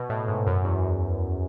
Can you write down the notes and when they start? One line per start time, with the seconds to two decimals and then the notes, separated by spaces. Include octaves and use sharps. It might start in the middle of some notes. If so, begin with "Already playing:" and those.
Already playing: B2
0.09 A2
0.28 G#2
0.47 F#2
0.65 E2